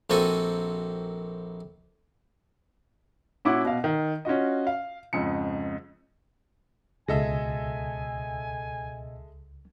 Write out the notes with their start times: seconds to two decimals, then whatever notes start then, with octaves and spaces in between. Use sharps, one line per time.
0.10 A#1 A#3 C4 F#4 A4 G#5
3.45 A#2 C#4 E4 F#4 F#5 D6
3.65 B2 F5
3.84 D#3
4.25 C#4 F4 F#4 D#5
4.67 F5
5.13 F2 G#2 C#3 C#7
7.08 C#2 B2 G#3 A4 D#5 E5 G#5 A#6